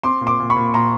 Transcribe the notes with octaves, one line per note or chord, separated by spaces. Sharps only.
C4 C6 D6
A#2
C6 D6
A#2
B5 C#6
A#2
A#2 A#5 C6